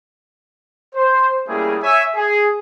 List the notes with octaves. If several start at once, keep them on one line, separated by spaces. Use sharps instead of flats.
C5
G3 A3 A#3 C#4 E4 G#4
C#5 E5 G#5
G#4